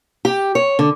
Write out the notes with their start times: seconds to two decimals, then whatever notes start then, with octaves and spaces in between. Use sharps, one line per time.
0.25 G4
0.55 C#5
0.79 D3